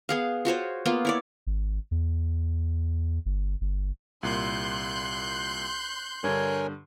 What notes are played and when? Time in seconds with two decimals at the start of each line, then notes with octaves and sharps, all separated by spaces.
0.09 B3 G#4 F5
0.45 F4 F#4 C5 C#5
0.86 A#3 B3 F4
1.05 E4 C#5 D5
1.47 G#1
1.91 E2
3.26 G1
3.61 G1
4.23 C2 A#2 C6 F#6 G6
6.24 G2 D3 A#4 C#5 G#5